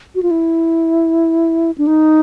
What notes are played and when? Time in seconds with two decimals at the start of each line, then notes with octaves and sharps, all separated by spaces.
0.15 F#4
0.23 F4
0.31 E4
1.78 D4
1.87 D#4